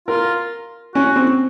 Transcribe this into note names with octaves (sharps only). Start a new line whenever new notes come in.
F4 A#4
C#4 F#4
C4